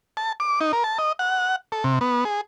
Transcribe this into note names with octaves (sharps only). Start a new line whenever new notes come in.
A5
D6
D#4
A#4
A5
D#5
F#5
A4
C3
B3
G#4